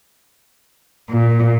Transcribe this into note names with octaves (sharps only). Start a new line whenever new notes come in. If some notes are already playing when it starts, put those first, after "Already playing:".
A#2